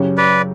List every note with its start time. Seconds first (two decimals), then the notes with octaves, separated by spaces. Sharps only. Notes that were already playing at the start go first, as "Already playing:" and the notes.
Already playing: F#2 C#3 F#3 C#4 G4
0.17 B4 D5